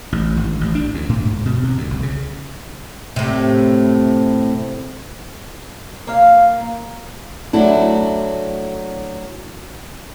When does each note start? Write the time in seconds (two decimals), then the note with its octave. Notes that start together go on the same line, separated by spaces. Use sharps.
0.12 A1
0.37 G#1
0.61 A1
0.75 D4
0.94 D2
1.09 A2
1.25 G#2
1.45 B2
1.63 C3
1.78 D2
1.91 C2
2.03 C#3
3.16 A2 C3
6.07 A#3 F5
7.53 F#3 A3 D4 E4